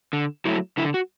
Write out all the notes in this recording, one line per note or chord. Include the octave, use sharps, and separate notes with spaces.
D3
F#3 A3 E4
D3 E4
F#4